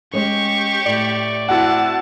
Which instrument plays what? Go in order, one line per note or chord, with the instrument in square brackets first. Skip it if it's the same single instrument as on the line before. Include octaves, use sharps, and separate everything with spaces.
[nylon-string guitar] G#3 C#4 C#5 [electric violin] G4 C#6
[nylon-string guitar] A2 [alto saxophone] D5
[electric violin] C4 A5 [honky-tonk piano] E4 F#4 F#5